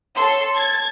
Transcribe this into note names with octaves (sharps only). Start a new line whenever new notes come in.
A4 C#5 C6
G#6 A6